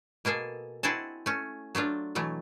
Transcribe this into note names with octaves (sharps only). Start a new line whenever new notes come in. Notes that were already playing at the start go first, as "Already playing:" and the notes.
B2 A#3 G#4 A4
C4 E4 F#4 G#4 D#5 A5
A3 C#4
F#3 A3 D4 F4
B2 E3 F#3 A3